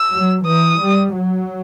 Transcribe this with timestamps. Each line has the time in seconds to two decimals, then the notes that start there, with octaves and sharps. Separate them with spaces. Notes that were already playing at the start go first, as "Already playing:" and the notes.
Already playing: E6
0.12 F#3
0.47 E3 D#6
0.81 G3
1.14 F#3